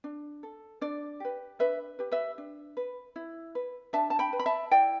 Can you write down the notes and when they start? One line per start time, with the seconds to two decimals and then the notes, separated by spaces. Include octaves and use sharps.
0.04 D4
0.43 A4
0.81 D4 D5
1.20 G4 B4
1.59 D4 B4 E5
1.99 G4 B4
2.12 B4 E5
2.38 D4
2.77 B4
3.16 E4
3.55 B4
3.93 D4 E5 A5
4.10 A5
4.19 G5 B5
4.33 B4
4.39 B5
4.46 E5 A5
4.71 E4 D5 G5